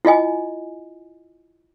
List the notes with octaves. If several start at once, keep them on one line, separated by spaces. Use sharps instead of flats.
E4 F4 D#5 G#5